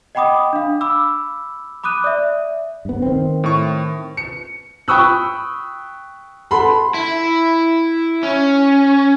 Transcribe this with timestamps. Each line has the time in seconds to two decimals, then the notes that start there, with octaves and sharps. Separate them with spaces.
0.15 D#5 F#5 G5 B5 D6 D#6
0.53 D4 F5
0.81 B5 D6 E6
1.83 B5 D6 D#6 F#6 D#7
2.04 D5 E5
2.85 G2 B3
3.02 D#3 C4
3.44 A2 C#6
4.17 C#7
4.88 G5 B5 C#6 D#6 E6 F#6
6.51 A4 F#5 A5 B5 C6
6.94 E4
8.23 C#4